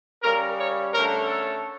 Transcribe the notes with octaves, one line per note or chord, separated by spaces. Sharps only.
C#3 G3 C#4 A#4
C#5
D3 A3 C#4 A#4
A4